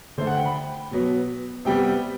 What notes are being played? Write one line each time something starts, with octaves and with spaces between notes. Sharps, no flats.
D3 A3 C5
F#5
G5
B5
G5
B2 F#3 B3
C3 G3 B3 G5